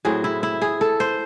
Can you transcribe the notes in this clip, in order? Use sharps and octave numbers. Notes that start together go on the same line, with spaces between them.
A2 F#3 C4 G#4
E4
E4
G#4
A4
C5